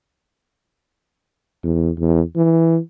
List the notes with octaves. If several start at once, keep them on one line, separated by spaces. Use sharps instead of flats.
E2
E2
E3